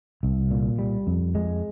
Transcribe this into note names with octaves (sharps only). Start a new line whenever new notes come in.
C2
A#2
G3
F2
G#3